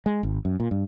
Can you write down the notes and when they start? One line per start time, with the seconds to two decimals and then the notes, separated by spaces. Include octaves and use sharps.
0.06 G#3
0.23 G#1
0.45 F#2
0.60 A#2
0.71 G2